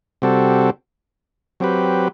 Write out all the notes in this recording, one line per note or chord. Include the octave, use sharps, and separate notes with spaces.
C3 G3 C4 F#4 A4
F#3 C4 G4 B4